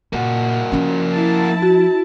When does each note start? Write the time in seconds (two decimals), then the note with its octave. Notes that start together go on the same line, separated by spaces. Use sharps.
0.13 A#2 A#3 F#4
0.72 F3 C#4
1.12 E4 A5
1.62 F#4